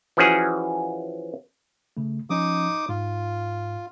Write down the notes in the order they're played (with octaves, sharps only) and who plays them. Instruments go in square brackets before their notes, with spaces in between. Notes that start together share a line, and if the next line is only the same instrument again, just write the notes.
[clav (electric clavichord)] E3 F3 C#4 F#4 G#4
[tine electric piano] C#3 A3
[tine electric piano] F3 C#4 [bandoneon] D#4 D6 D#6
[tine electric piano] G#2 [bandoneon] F4